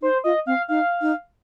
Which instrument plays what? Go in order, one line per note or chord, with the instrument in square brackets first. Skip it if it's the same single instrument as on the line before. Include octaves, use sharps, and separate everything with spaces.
[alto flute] D#4 [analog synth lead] C5
[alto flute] F4 [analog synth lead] D#5
[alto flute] C4 [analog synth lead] F5
[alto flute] D#4 [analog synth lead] F5
[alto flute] D#4